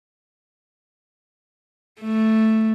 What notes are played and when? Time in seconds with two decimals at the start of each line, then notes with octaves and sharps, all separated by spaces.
2.01 A3